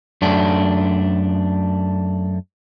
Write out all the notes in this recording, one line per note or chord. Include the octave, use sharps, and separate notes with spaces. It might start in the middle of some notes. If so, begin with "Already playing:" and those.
F#2 A3 D4